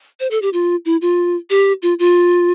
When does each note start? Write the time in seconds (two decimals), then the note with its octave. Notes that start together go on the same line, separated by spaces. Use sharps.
0.20 C5
0.31 A4
0.42 G4
0.53 F4
0.85 E4
1.02 F4
1.50 G4
1.82 F4
1.99 F4